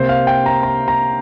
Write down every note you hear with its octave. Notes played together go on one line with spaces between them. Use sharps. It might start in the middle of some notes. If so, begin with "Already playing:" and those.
Already playing: C3 A#3 C5
F5
G5
A#5
A#5
A#5